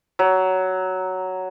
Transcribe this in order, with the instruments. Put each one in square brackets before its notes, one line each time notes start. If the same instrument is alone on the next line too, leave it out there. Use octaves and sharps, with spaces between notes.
[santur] F#3